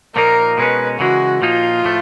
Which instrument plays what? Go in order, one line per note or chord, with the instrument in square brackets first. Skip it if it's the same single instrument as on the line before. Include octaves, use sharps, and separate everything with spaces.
[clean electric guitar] A#2 F3 A#3 D#4 [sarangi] A#4
[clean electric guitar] B2 G#3 C#4 [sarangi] B4
[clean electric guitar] C#3 E3 G#3 [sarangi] F#4
[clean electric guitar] A#2 F3 A#3 D#4 [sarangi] F4
[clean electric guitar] A2 F3 A3